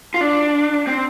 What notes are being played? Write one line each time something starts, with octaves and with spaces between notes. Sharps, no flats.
F4
D4
C4